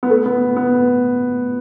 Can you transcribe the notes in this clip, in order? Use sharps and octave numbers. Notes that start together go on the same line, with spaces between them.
B3
A3
B3
B3